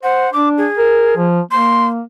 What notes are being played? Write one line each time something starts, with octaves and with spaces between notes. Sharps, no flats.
C5 F#5
D4 D6
G#4
A#4
F3
A#3 C6